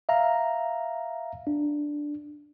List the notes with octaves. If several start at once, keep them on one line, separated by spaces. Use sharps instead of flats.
E5 F5 A#5
D4